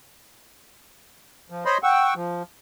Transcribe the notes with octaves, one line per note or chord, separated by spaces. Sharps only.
F3
C5 C#5 D#5 B5 C6
F#5 G5 C#6 E6
F3